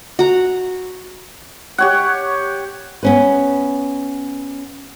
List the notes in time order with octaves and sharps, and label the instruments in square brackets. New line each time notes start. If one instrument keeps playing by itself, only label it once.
[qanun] F#4 A#5
[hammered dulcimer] G4 C#5 F#5
[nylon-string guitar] B3 C#4 B4